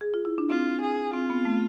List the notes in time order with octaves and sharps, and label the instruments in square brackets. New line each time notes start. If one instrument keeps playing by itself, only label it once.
[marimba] G#4
F4
E4
D4
[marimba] C4 [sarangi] F4
[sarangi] G#4
[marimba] C4 [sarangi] F4
[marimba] B3
A3